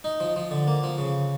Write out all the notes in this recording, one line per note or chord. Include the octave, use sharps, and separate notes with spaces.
D#4
F3
F3
D3
A#3
F3
C#3